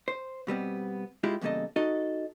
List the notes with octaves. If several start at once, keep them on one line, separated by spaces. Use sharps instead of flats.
C5
B2 G3 B3 C4
G#3 E4 F4 G4
E2 G2 C#3 A#3 A4 D#5
D#4 F#4 A4 D#5